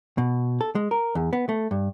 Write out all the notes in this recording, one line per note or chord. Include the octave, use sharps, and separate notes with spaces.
B2
A4
G#3
A#4
E2
B3
A3
G2